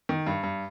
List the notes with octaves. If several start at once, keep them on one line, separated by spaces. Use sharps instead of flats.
D#3
G2
G2